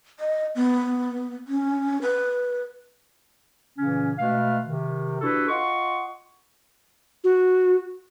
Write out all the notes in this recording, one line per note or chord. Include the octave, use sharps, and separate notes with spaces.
D#5
B3
C#4
B4
A#2 C#3 E3 C#4
B2 G#3 A3 B4 F5
C3 D#3
D4 E4 F#4 G4 A4 B4
F4 D#5 F#5 C6 C#6
F#4